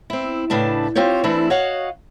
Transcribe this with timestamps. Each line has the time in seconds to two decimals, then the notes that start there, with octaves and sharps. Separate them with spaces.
0.10 C4 E4
0.50 A2 C#3 D4 B4 A5
0.95 C4 F4 G4 C5 C#5
1.24 E3 A3 C4 D4 E4
1.50 F#4 C#5 D#5 F5 F#5